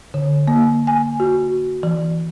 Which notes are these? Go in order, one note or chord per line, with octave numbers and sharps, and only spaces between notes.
D3
A#3
G#5
F#4
E3